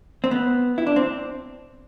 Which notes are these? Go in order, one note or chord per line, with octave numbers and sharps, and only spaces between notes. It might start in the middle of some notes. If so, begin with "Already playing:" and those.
C4
B3
E4
D4
C4